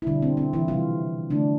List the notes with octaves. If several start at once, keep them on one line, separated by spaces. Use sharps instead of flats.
E4
B2 D3 G3 D4
C4
C4
E3 E4
C3 F3 G3 F4
D3 F3 A3 D4